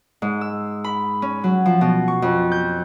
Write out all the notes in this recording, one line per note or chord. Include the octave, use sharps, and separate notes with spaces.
G#2
E6
B5
C#4
F#3
F3
B2
C#6
F2
G6